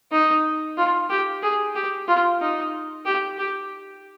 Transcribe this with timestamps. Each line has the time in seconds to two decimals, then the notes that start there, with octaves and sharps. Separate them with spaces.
0.12 D#4
0.77 F4
1.10 G4
1.43 G#4
1.75 G4
2.08 F4
2.41 D#4
3.06 G4
3.38 G4